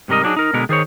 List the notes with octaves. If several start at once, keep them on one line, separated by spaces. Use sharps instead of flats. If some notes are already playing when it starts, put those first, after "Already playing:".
G#2 C3 G3 A#4 D#5
F#3 D4 D#4 G#4
D#4 A#4
B2 D3 G#3 B3 A#4
D#3 G#4 C5 C#5